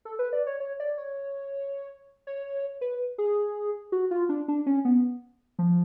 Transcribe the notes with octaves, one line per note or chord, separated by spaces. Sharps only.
A4
B4
D5
C#5
C#5
D5
C#5
C#5
B4
G#4
F#4
F4
D4
D4
C#4
B3
F3